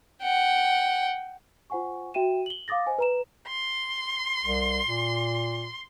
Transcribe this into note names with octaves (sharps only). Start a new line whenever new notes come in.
F#5 G5
F4 C5 F#5 G#5 C#6
F#4 E5 G5 D#7 E7
F#7 G7
F5 D6 D#6 A6 A#6
C5 D#5 G#5
B4 A#5 E7
C6
C2
A#2